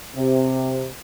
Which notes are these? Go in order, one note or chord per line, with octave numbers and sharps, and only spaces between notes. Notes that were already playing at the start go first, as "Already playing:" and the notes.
C3